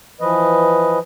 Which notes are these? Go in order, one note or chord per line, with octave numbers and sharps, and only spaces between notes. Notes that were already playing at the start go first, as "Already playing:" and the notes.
E3 F3 B4 D#5